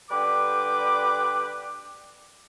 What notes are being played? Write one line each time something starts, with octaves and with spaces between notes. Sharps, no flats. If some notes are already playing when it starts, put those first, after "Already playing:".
D3 G3 B4 G5 D6